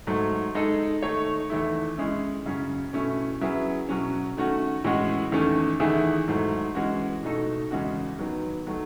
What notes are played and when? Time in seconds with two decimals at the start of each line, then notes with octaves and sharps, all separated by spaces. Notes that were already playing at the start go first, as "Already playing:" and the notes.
0.07 G#2 F#3 A3
0.55 G#3 D#4 A4
1.02 D#3 A3 D#4 A4 C#5
1.50 E2 D#3 A3 E4
1.98 G#3 C#4 E4 G#4
2.46 F#2 C#3 F#3 C#4
2.93 B2 A3 C#4 E4
3.41 F#3 C#4 E4 G#4 B4
3.89 B2 F#3 C#4
4.37 D#3 A3 C#4 F#4
4.84 A2 E3 G#3 C#4 F#4
5.32 E2 D#3 A3 C#4
5.80 E2 D#3 A3 E4 G#4
6.28 G#2 F#3 A3
6.75 E3 G#3 C#4 F#4
7.23 B2 A3 D#4 A4
7.71 E2 C#3 G#3 C#4 F#4
8.19 D#3 F#3 B3
8.67 D#3 F#3 A3